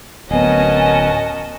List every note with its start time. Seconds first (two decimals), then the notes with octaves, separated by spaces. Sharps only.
0.31 D1 B3 C#4 F#4 A#4 D#5 G#5 A5